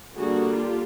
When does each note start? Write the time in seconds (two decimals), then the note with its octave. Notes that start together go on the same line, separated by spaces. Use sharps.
0.16 D3 G3 A#3 D4 F#4 G#4
0.55 F4 G4